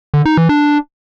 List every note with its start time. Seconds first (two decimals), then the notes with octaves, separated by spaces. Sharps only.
0.14 D3
0.25 D#4
0.37 E3
0.49 D4